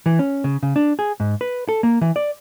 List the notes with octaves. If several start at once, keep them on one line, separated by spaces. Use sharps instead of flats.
E3
C#4
C#3
C#3
D4
G#4
G#2
B4
A4
A#3
E3
D5